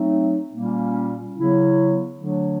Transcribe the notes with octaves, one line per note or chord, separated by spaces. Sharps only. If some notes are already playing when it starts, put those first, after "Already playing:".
Already playing: F#3 A3 C4 D#4
A#2 G3 A#3 C#4 F4
C#3 F#3 B3 E4
D3 F#3 A3 D4